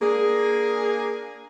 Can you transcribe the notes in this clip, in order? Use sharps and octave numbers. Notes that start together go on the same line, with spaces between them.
A#3 D4 G#4